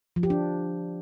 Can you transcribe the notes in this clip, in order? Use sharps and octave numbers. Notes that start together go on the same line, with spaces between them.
F3
G4
D4